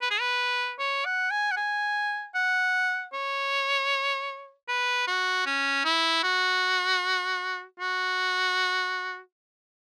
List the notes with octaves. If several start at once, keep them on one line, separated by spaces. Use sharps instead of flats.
B4
G#4
B4
C#5
F#5
G#5
F#5
G#5
F#5
C#5
B4
F#4
C#4
E4
F#4
F#4